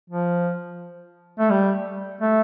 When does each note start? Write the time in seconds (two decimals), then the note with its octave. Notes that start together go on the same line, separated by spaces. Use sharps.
0.10 F3
1.39 A3
1.50 G3
2.21 A3